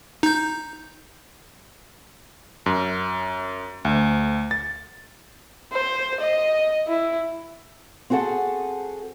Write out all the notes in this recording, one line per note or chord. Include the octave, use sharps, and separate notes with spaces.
D#4 G6
F#2
D2
A6
C5
D#5
E4
C4 F#4 G#4 A4 F#5